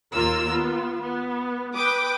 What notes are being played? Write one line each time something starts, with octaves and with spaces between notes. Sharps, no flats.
D#2 A#3 F4 A#4 E6
B3 F4
B3
B4 G5 D6 D#6